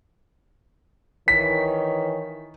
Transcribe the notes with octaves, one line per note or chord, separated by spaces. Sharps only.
D#3 E3 C#5 B6